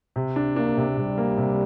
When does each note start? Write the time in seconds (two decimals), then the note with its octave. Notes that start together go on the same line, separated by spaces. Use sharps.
0.16 C3
0.36 D4
0.56 A#3 D4
0.77 C3
0.97 C3 G3
1.18 A#3
1.38 C3